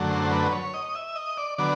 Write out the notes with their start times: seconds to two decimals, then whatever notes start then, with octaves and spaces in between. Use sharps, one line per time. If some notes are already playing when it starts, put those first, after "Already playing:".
Already playing: F#2 D3 F#3 A3
0.10 C5
0.31 B4
0.52 C#5
0.74 D#5
0.95 E5
1.16 D#5
1.37 D5
1.58 D3 F#3 B3 D5